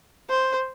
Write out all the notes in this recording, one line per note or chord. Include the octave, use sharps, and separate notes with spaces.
C5